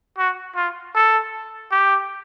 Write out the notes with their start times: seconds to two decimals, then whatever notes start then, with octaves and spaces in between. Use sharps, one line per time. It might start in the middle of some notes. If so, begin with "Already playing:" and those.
0.18 F#4
0.56 F4
0.95 A4
1.72 G4